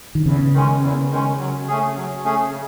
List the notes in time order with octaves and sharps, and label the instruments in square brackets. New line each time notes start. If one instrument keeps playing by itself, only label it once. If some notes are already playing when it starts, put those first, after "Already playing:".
[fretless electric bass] D#3
[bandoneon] E2 [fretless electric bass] C#3
[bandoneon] D#3 G#3 C#4
E2
D#3 G#3 C#4
F#3
A3 C#4 G#4
F#3
A3 C#4 G#4
C#3